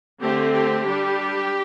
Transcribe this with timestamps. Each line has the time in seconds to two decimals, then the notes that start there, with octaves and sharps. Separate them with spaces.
0.20 D3 A3 C4 G4
0.53 G4
0.86 G3 D4